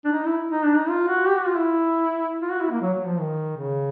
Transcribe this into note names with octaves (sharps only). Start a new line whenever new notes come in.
D4
D#4
E4
D#4
D4
D#4
F4
F#4
G4
F#4
F4
E4
F4
F#4
E4
A#3
F#3
F#3
F3
D#3
C#3